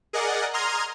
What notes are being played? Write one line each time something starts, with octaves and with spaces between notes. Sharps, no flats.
G#4 A#4 D5 D#5 F#5
A#5 C6 D#6 F6 G#6